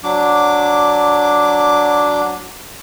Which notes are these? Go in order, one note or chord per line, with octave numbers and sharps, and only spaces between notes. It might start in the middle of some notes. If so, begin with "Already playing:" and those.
F#3 D4 D6